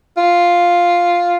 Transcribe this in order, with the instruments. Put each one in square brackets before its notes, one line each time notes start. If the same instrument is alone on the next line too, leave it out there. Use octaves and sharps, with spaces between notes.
[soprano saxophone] F4